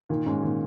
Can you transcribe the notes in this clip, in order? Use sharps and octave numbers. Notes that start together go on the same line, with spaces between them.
A#2 D#3 A#3
G#2 G#3 C#4
A#2 D#3